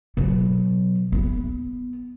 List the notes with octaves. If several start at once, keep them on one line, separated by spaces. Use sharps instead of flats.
B2 F#3
B3